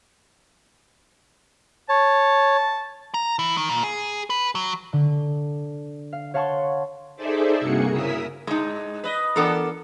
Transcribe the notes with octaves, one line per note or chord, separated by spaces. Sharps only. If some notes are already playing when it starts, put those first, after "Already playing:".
C#5 A5
A#5
E3
D#3
A#2
G#4
B4
F#3
D3
F5
C#5 F5 F#5 A5 C6 C#6
D#4 G#4 A4 C5 D5 E5
G2 C3 A#3 F#4 G#4 C#7
C#3 E4 A#4 D#6 E6 B6
G#2 G#3 D#4
B4 D#5
E3 B3 D4 A4 A#4